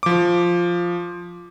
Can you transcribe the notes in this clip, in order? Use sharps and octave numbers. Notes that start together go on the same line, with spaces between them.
F3 D6